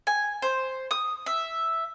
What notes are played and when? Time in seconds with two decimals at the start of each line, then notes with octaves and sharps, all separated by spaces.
0.07 G#5
0.42 C5
0.91 D#6
1.26 E5